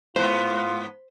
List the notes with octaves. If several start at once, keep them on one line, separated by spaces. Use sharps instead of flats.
G#2 B3 F4 C5